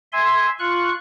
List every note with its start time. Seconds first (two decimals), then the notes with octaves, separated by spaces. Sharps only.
0.13 E5 G#5 C6
0.59 F4 C#6 F#6